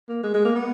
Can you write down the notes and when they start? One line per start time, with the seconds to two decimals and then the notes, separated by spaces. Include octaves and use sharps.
0.09 A#3
0.23 G#3
0.34 G#3
0.45 A#3
0.55 B3